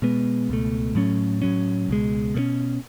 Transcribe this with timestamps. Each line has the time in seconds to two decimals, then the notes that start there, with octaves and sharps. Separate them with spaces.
0.02 B2 G#3 B3
0.49 C#2 B2 A3
0.95 A2 F#3 A3 C#4
1.42 A2 F#3 C#4
1.89 C#2 B2 G#3
2.34 B2 A3 C#4